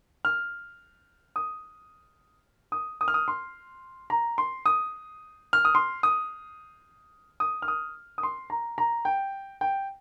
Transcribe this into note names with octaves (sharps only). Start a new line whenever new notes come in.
F6
D#6
D#6
D#6
F6
D#6
C6
A#5
C6
D#6
F6
D#6
C6
D#6
D#6
F6
D#6
D#6
C6
A#5
A#5
G5
G5